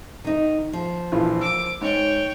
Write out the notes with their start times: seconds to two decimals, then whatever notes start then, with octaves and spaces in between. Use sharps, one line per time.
0.24 D#3 D#4
0.73 F3
1.12 A#1 E3 F4
1.41 D6 E6
1.81 G#2 C#5 G5